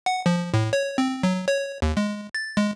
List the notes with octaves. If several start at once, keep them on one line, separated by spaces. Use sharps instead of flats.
F#5
F3
A2
C#5
C4
F#3
C#5
D#2
G#3
A6
G#3